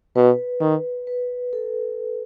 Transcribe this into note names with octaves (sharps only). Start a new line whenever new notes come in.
B2 B4
D#3
B4
A4